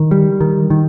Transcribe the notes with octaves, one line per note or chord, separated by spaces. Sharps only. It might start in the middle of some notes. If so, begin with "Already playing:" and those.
Already playing: D#3
G3
D#3
D#3